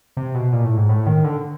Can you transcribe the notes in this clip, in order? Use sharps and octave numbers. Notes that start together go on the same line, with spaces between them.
C3
B2
A#2
A2
G#2
A2
D#3
D3